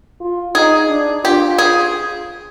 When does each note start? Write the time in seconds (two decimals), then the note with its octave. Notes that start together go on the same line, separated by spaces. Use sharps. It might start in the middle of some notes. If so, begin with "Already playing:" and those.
0.21 F4
0.55 D#4 G#4
0.89 D4
1.24 F4 G4
1.58 G#4